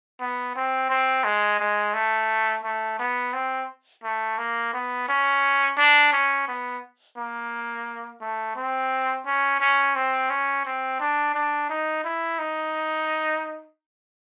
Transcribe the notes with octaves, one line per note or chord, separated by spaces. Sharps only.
B3
C4
C4
G#3
G#3
A3
A3
B3
C4
A3
A#3
B3
C#4
D4
C#4
B3
A#3
A3
C4
C#4
C#4
C4
C#4
C4
D4
D4
D#4
E4
D#4